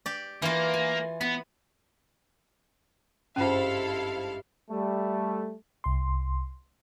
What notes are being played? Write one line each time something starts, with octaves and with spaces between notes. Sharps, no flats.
G4 D5
E3 A#3 F4
G#5
B3 B5
G#1 G2 C#4 E4 F4 A4 C5 F5
G3 A3
C2 C6